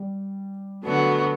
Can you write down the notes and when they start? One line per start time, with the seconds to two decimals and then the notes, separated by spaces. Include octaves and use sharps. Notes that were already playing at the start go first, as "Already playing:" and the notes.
Already playing: G3
0.83 D3 F#3 A3 B3 F#4